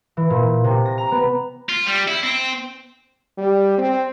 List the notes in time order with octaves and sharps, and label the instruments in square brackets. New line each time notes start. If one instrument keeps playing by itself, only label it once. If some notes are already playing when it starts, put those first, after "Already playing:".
[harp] E3
A#2
C3
A#6
A#5
B3
[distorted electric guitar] F4
G3
E4
C4
[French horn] G3
C4